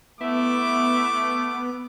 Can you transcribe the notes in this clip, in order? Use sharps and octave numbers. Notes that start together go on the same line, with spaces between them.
A3 B3 E4 D6